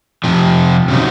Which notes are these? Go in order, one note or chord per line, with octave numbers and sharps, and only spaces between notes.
F2 C3 F3
C#3 F#3 C4 D#4